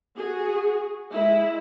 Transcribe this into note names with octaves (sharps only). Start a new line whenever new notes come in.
F#4 G#4
G#3 E4